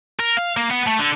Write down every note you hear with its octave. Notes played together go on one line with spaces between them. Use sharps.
A#4
F5
A#3
B3
A3
D3